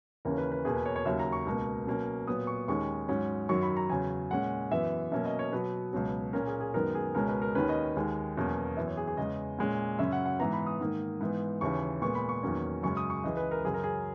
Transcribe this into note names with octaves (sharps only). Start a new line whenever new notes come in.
D#2 C#3 E3 A#3 C#4 A#4
B4
B4
E2 B2 A#3 G#4
B4
C#5
C#5
D#2 C#3 F#3 A#3 E5
A#5
C#6
C#2 B2 A#3
B2 F#3 A#3 C#4
A#2 F#3 B3 D#6
C#6
D#2 D#3 G#3 C#4 C#6
G#2 F#3 C#4
F#2 D#3 F#3 C#6
B5
A#5
E2 C#3 F#3 G#5
A#2 G#3 C#4 F#5
F#2 E3 B3 E5
B2 F#3 A#3 C#4 E5
D#5
C#5
B2 F#3 B3 B4
C#2 B2 F#3
A#2 A#3 C#4 A#4
G#4
G#4
F#2 D#3 G#3 B3 A#4
G#4
C#2 B2 G#3 C#4 A#4
B4
A#4
D#2 D#3 A#3 C#4 B4
D#5
D#2 D#3 G#3
E2 B2 F#3 A#3 C#4
F#2 E3 B3 E5
C#5
G#4
G#4
E2 C#3 G#3 D#5
A#2 G#3 C#4
F#2 C#3 F#3 C#4 E5
F#5
F#5
G#2 E3 B3 A#5
B5
D#6
G#2 D#3 A#3
G#2 E3 B3
D#2 C#3 E3 C#6
A#2 G#3 B3 C#6
B5
C#6
E2 D#3 F#3 A#3 C#4
F#2 C#3 G#3 C#4 C#6
D#6
C#6
C#2 C#3 E3 G#3 D#5
B4
A#4
F#2 C#3 F#3 G#4
A#4
G#4